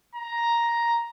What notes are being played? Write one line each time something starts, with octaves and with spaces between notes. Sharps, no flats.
A#5